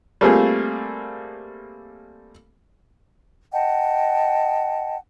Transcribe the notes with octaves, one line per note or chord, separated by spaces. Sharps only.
G3 A3 A#3 C4 F4 G#4
D#5 F#5 G5 A5